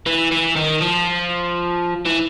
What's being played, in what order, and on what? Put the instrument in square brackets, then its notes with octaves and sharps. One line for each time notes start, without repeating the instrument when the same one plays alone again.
[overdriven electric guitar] E3
E3
D#3
F3
E3